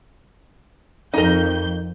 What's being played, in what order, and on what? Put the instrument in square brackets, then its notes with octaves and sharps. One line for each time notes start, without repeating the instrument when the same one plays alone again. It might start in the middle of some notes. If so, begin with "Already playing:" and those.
[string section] F2 G6 [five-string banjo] D#4 A#4